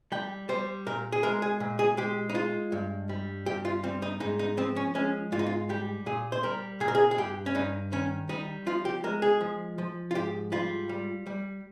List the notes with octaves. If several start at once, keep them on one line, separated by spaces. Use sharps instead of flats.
G3 G5
G3 C5
A#2 A#4
G#4
G#3 A#4
G#4
A#2
G#4
G#3 G4
D#4
G#3 F4
G2
G3
G2 G4
F4
G3 C4
D#4
G#2 D#4
D#4
F3 C4
C#4
G#3 C#4
G#2 F4
D#4
F4
G3 G4
A#2 G#4
C5
G3 A#4
A#2 G#4
A#4
G#4
G#4
G2 G4
C#4
G2 D#4
D#3 C#4
G3 D#4
F3 F4
G4
G#3 A#4
G#4
F3
F3
F4
G#2 G4
G3 F4
G3
G3